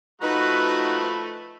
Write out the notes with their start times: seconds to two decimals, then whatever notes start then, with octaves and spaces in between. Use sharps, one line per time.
0.22 F3 A3 D#4 F#4 B4 B5